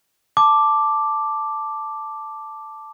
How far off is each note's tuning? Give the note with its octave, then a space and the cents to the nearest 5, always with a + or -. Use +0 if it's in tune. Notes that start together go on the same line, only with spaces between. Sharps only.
A5 +0 D6 +0